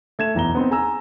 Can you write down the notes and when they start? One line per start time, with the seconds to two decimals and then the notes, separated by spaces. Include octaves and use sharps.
0.19 A3 G#6 E7
0.34 B1 E2 A#5 G7
0.55 B3 C4 D#4
0.71 G#4 G#5 A#5 E6